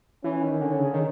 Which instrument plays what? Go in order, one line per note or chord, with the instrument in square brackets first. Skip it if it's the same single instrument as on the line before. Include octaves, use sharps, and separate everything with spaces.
[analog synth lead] E3 [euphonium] C#4
[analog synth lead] D#3
[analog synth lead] D3 [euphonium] C#4
[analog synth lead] C#3
D#3